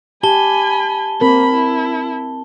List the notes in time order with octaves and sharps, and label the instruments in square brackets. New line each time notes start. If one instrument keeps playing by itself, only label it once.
[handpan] G4 [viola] G#5 B5 [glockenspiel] A5 G7
[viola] A#3 B5 [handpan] C4 A#4
[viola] E4